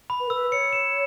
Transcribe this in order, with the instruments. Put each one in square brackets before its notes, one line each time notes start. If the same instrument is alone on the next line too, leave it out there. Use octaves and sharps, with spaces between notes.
[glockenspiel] B5
[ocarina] B4
A#4
[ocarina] B4 [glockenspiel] E6
[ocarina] C#5 [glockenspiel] C#7
[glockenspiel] E7